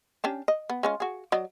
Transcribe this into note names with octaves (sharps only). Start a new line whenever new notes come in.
C#4 D4 G4
D#5
B3
G#3 C#4 F4
F#4 G#4
F#3 D5 D#5